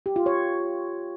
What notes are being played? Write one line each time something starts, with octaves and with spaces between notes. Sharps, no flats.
G4
F4
C#5